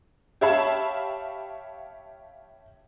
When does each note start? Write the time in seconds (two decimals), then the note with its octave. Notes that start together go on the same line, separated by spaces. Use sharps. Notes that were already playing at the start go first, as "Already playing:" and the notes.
0.41 G4 C#5 E5 F5 A5 B5